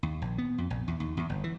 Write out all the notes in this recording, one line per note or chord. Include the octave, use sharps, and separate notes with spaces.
D#2
A#1
B3
F2
A#1
E2
D#2
E2
G1
E3